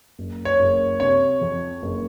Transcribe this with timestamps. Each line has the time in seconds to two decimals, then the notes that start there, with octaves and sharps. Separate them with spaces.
0.19 F#1
0.45 C#5
0.59 F#1
1.00 C3 C#5
1.41 F2
1.82 F#1